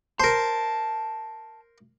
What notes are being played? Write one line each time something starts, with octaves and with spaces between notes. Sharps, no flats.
A#4 C5 A5